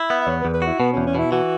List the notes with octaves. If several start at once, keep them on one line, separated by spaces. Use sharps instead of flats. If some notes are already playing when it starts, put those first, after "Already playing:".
Already playing: E4
B3 E5
E5
E2 C#5
B4
E2
B4
E4 F#4
B2 B3
E2 C#4
C#4
B2 E4
E3 F#4